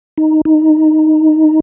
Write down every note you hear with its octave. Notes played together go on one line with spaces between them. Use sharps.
D#4
D#4